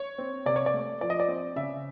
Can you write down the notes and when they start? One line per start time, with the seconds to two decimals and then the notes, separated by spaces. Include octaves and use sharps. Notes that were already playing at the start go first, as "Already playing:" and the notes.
Already playing: C#5
0.18 C4
0.46 C3 D5
0.56 C#5
0.66 D5
0.74 A3
1.01 F3 D5
1.10 D#5
1.20 D5
1.28 C4
1.56 C#3 E5